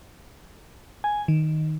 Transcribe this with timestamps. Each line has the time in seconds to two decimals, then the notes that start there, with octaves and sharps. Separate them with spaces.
1.04 G#5
1.28 D#3